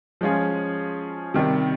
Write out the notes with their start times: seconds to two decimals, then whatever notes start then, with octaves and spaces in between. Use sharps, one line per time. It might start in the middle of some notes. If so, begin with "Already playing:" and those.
0.21 F3 G#3 C#4 F4 G#4
1.34 C3 D#3 G3